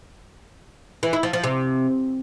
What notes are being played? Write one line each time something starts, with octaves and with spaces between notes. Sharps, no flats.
E3
E4
F3
F3
C3